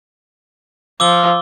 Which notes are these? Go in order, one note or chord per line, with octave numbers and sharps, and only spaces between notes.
F3 D6 E6 G7